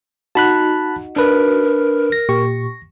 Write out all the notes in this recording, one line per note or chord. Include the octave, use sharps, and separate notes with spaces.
D#4 F#4 A5 B5 F#6
D4 A#4 B4
A#6
A#2 G4 C#6